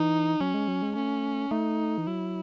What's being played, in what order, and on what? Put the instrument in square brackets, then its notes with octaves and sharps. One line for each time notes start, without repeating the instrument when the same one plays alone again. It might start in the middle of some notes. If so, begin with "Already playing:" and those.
Already playing: [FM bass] E3 [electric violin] D#4
[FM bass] F#3 [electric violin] C#4
[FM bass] G#3
F#3
G#3
[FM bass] A3 [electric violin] C#4
[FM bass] A3 [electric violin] D#4
[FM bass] E3
[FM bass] F#3 [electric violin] E4